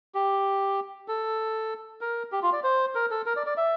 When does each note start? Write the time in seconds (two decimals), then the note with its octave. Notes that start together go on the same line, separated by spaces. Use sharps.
0.15 G4
1.08 A4
2.01 A#4
2.32 G4
2.43 F4
2.53 D5
2.64 C5
2.95 A#4
3.11 A4
3.26 A#4
3.37 D5
3.47 D5
3.57 E5